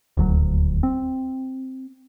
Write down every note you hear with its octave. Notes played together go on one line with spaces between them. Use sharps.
D#1 D2 F#3
C4